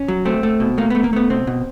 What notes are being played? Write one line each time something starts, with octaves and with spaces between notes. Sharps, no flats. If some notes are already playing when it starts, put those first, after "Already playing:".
Already playing: C#4
F#3
A3 C4
A3
B2
A3 A#3
A3 B3
A#3
A3 B3
B2 C4
B2